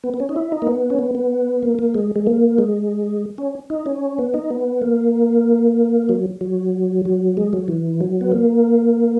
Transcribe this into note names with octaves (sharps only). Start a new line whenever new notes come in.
B3
B3
C#4
D#4
E4
D#4
A#3
B3
C#4
B3
B3
A#3
A#3
G#3
G#3
A#3
G#3
C#4
D#4
C#4
B3
D#4
B3
A#3
F#3
F#3
F#3
G#3
F#3
E3
F#3
B3
A#3